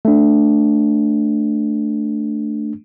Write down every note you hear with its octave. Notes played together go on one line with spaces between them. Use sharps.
A3 D4